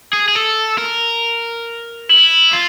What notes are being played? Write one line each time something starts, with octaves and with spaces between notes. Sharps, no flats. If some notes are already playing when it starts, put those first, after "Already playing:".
G#4
G#4
A4
A#4
E4
F4